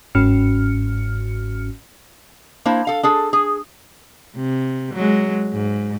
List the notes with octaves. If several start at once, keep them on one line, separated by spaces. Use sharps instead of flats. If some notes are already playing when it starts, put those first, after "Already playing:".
G1 G#2 C#4 F#4 F6 C#7
A#3 D4 E4 C5
A4 F5
D4 G#4 A4
G#4
C3
F#3 G#3
G#2